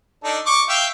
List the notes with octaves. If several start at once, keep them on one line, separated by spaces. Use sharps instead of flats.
D4 D#4 A4
C#6 D6
E5 F5 G5